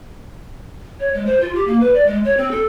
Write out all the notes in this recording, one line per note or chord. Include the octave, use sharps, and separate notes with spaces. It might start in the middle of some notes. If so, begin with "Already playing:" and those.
C#5
G#3
C5
F4
G4
A#3
B4
D5
G#3
C#5
C4
A4